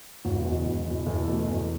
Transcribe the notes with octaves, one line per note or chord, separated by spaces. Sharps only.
E1 F#4
E2
B2
E1
E2 B2
E2 A4
B2 A3
E2